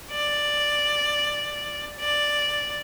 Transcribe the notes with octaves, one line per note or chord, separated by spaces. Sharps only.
D5
D5